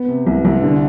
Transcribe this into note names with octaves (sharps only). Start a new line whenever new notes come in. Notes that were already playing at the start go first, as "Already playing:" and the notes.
Already playing: B3
C3
C2
C2
D3